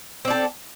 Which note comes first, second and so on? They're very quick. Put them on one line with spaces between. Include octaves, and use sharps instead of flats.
C4 D5 A4